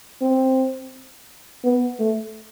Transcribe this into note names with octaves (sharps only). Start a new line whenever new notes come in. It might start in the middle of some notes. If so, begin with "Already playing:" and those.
C4
B3
A3